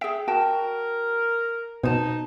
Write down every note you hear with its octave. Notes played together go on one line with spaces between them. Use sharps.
G#4 E5 G5
F#4 A#4 G5 A5
B2 D#4 C5 A5